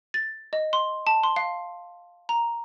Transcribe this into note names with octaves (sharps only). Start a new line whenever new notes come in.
A6
D#5
C6
A5
C6
F5
A#5